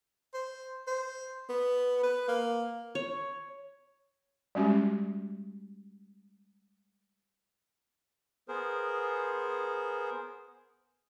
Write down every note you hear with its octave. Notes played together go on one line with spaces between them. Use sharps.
C5
C5
B3
B4
A#3
C#5
G3 G#3 C#4 F#4 G4
B3 G#4 A#4 C5